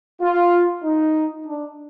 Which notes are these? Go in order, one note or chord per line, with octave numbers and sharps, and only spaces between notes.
F4
D#4
D4